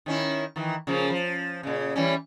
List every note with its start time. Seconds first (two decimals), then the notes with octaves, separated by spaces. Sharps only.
0.06 D#3 C#4 E4
0.56 D#3 E3
0.87 C#3 F3 A#3
1.10 F3
1.63 A#2 C#3
1.96 E3 G3 C#4